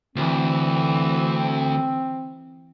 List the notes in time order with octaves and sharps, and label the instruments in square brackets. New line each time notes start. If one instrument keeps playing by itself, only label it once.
[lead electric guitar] D2 [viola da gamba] E3 [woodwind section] C4